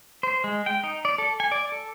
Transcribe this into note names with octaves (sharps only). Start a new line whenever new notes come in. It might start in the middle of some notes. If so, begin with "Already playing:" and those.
C5
G#3
G5
D#4
D5
A4
G#5
D5
A4